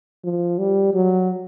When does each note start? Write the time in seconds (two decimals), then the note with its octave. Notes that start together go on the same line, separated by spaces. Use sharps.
0.24 F3
0.58 G3
0.94 F#3